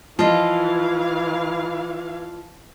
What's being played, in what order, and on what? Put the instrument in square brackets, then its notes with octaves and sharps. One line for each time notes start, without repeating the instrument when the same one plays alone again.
[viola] E3 F5 [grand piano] F3 [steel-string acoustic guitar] F4 D#5